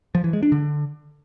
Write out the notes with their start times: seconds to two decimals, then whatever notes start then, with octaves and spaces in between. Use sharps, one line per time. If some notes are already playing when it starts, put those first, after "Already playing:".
0.15 F3
0.24 E3
0.33 G#3
0.43 D4
0.52 D3